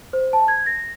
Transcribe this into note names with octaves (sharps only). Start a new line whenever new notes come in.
C5
A5
G#6
A#6